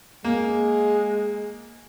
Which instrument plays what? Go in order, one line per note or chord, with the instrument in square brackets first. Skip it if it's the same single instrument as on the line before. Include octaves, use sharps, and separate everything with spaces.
[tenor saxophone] G#3 [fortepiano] A#3